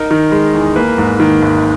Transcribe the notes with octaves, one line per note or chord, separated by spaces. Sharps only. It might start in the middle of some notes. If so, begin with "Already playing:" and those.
Already playing: D#4 A#4
D#3
G#3
E2
A#3 B4
G#2
D#3
G#1